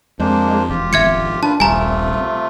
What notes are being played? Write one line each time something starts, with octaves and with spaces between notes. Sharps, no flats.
F2 G#3 A#3 D4 C5
E1 F4 G4
G#1 F3 E5 G#6 C#7
A#2 D4 F4 B4 A5
D#1 A#1 C3 G3 A3 F4 G#5 A#5